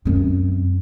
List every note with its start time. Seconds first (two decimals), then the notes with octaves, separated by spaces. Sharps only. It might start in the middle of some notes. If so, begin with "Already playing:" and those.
0.05 F#2 C4